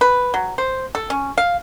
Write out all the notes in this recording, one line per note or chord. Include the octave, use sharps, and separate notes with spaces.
B4
F#3
C5
A4
C#4
F5